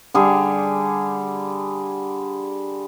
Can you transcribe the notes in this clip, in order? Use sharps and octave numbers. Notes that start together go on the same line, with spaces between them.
D3 G3 G#4